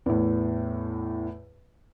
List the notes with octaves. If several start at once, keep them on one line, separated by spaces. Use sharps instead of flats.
E2 A2